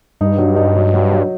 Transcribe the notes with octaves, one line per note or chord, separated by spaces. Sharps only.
G2 D#4
F#3
D#4
F#3
F#3
F#3